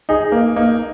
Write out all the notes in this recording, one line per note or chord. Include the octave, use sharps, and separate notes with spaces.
D#4 G#4
A#3
A#3 D#4